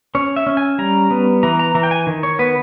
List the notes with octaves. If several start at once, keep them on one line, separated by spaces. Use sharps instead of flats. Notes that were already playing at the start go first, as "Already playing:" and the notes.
C#4 C#5
E5
C#4
G#5
G3 A#5
B3
E3 A#5
A#5
E3 A#5
G5
G#5
D#3
C#5
B3 B4